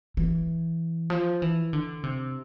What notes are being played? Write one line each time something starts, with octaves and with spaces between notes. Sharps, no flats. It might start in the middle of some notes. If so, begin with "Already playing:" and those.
E3
F3
E3
D3
C3